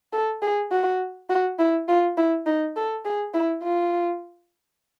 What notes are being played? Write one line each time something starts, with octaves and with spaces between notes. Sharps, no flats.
A4
G#4
F#4
F#4
E4
F4
E4
D#4
A4
G#4
E4
F4